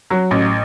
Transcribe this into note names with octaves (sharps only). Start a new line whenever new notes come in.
F#3
A1